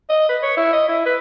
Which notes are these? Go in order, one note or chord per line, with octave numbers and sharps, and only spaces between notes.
D#5
B4
C#5
E4
D#5
E4
B4